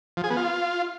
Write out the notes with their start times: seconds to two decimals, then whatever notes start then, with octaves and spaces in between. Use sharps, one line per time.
0.17 F3
0.24 G#4
0.30 B3
0.37 F4